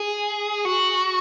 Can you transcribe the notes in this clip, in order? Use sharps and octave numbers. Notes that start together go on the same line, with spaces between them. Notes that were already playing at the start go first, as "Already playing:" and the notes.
Already playing: G#4
F#4